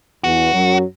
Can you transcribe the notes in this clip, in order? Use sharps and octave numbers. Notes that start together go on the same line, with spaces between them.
E2 E3 F#4
F#2 F#3